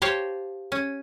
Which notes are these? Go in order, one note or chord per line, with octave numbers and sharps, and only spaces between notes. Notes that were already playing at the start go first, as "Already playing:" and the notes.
G4 C5 C#5 F5 G5 A5
C#4